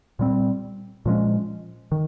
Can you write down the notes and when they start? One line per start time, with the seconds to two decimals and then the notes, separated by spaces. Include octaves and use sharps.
0.19 A#2 G3 C4
1.06 A#2 F3 G#3 C#4
1.92 D#3